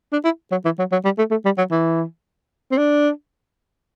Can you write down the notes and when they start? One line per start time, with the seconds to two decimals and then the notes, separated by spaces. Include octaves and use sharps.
0.12 D4
0.25 E4
0.51 F#3
0.65 E3
0.79 F#3
0.92 F#3
1.04 G3
1.18 A3
1.31 A3
1.45 G3
1.58 F#3
1.71 E3
2.71 C4
2.78 D4